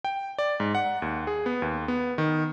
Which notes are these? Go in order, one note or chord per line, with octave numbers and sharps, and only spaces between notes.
G5
D5
G#2
F#5
D#2
G#4
B3
D#2
B3
D#3